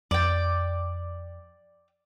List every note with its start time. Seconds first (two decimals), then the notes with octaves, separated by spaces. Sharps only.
0.11 F2 D5 G5